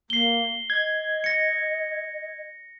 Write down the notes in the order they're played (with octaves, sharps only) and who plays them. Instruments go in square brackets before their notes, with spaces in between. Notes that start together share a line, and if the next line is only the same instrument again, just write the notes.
[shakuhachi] A#3 [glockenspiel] C7 G7
[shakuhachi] D#5 [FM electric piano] G#6
[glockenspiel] A#6 C#7